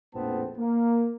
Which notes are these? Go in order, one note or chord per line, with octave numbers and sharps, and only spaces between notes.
A#1 F2 A2 B3 C4 A5
A#3